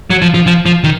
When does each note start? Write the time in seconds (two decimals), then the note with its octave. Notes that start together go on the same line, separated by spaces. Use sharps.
0.10 F#3
0.22 F3
0.34 F3
0.47 F3
0.66 F3
0.84 D#3